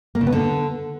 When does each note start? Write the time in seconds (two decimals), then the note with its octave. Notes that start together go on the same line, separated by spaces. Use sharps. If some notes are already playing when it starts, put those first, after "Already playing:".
0.15 A#3
0.21 C#3
0.27 B3
0.32 D3